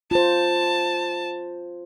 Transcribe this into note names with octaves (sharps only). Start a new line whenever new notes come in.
F4 C5 A5